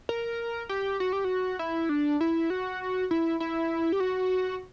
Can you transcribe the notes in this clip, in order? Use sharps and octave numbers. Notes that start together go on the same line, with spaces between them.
A#4
G4
F#4
G4
F#4
E4
D4
E4
F#4
E4
E4
G4
F#4